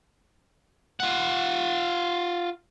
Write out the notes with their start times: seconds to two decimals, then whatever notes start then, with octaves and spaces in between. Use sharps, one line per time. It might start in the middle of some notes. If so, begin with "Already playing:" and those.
1.00 F4 F#5